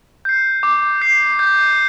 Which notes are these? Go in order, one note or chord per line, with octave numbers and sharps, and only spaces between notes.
G6 C7
D6
G6 C7
G6